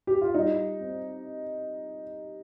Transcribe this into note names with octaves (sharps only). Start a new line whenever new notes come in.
G4
F4
G3 D#4
C4